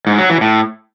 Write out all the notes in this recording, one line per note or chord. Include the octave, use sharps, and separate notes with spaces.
G#2
F#3
E3
A2